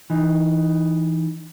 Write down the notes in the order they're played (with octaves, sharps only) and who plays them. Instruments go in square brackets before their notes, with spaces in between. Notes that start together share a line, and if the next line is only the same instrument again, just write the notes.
[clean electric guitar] E3 D#4